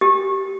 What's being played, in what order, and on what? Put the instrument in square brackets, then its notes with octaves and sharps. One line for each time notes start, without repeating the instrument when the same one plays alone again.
[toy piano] G4